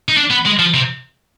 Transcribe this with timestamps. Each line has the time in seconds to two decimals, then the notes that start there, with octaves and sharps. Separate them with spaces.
0.09 D#4
0.17 D4
0.30 B3
0.46 G#3
0.59 F3
0.74 C3